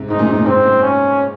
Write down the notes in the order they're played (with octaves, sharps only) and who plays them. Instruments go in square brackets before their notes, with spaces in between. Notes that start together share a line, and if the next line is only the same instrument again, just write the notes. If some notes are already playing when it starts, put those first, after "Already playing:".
Already playing: [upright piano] G#2 C3
[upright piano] G#2 [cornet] D#4
[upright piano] F#2 A#2
G#2
F#2 A#2
[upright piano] G#2 C3 [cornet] C4
[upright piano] F#2 A#2
[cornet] C#4